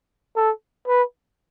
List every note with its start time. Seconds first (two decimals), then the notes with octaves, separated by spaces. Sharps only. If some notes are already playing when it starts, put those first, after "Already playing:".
0.36 A4
0.87 B4